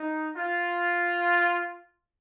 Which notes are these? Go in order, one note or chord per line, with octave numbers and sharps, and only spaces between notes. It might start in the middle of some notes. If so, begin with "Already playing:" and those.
Already playing: D#4
F4